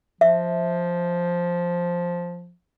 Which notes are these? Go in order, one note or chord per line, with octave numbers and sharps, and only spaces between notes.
F3 E5